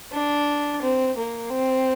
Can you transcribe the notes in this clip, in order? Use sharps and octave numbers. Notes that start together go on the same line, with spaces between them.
D4
C4
A#3
C4